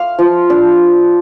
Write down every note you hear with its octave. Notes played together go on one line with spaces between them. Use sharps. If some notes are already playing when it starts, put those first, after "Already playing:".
Already playing: F5
F3
D4